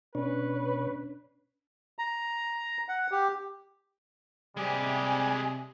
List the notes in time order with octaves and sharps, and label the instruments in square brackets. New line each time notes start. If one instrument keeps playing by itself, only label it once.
[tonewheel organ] B2 C#5 [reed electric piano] C#4 D4 [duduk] B4
[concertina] A#5
F#5
G4
[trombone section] C3 [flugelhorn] G3 [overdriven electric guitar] G#3 G4 [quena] G#5